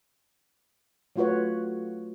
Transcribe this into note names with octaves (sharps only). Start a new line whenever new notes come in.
F#3 A3 F4 F#4 B4 C#5